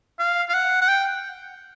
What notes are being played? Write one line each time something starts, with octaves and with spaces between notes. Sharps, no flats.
F5
F5
F#5
F#5
G5